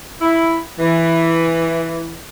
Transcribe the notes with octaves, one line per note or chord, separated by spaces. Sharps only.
E4
E3